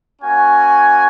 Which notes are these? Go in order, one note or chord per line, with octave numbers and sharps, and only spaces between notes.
A#3 C#4 F#4 G#5